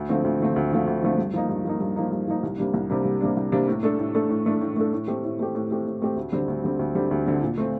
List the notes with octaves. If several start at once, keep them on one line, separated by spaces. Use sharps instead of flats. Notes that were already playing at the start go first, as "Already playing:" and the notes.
Already playing: D2
D3 F3 A3 C4
D2
D3 F3 A3 C4
D2
D3 F3 A3 C4
D2
D3 F3 A3 C4
G2
F3 A#3 D#4
G2
F3 A#3 D#4
G2
F3 A#3 D#4
G2
F3 A#3 D#4
C2
C3 G3 A#3 D4
C2
C3 G3 A#3 D4
C2
C3 G3 A#3 D4
C2
C3 G3 A#3 D4
A2
A3 D4 A4
A2
A3 D4 A4
A2
A3 D4 A4
A2
A3 D4 A4
A2
A3 C4 G4
A2
A3 C4 G4
A2
A3 C4 G4
A2
A3 C4 G4
D2
D3 G3 C4
D2
D3 G3 C4
D2
D3 G3 C4
D2
D3 G3 C4
A#2
A3 C4